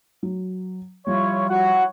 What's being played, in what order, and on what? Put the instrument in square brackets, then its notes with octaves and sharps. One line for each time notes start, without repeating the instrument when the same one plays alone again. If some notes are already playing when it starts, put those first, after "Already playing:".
[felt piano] F#3
[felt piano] F3 G3 [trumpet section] E4 F4 C#5
[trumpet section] E4 C#5 F#5 [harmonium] F#4